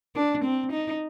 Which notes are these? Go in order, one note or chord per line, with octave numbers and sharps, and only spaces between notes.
D4
C4
D#4